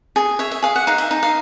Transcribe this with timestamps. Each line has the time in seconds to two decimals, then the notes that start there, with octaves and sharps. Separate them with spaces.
0.16 G#4
0.39 C#5 E5
0.51 E5
0.63 G#4 F5
0.76 F#5
0.87 D#4 F5
0.98 E5
1.11 D#4
1.23 F5